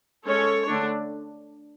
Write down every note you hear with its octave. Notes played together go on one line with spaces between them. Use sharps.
G#3 C#4 A4 C#5
D3 A3 D4